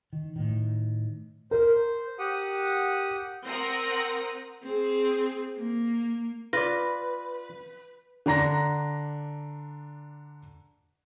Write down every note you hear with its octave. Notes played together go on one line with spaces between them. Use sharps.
D#3
A2 D#3
A#4 C5
G4 F#5 D#6
C4 A#4 F#5 A#5 D#6 A#6
C4 G#4
A#3
F4 B4 D5 A#6
D3 D4 A#5 A#6